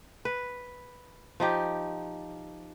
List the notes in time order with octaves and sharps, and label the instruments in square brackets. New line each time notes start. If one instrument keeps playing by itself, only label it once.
[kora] B4
F3 D#4 G4